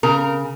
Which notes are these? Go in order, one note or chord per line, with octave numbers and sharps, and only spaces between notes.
C#3 A#4